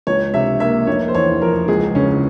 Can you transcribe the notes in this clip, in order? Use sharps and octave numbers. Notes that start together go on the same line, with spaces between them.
C#2 C#5
C3 E5
A#3 E5
F1 C#5
C5
E2 C#5
F3 A#4
C#2 G#4
C#3 C#4